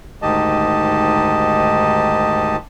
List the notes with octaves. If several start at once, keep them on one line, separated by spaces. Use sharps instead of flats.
D2 G#2 D#3 G4 D#5 A5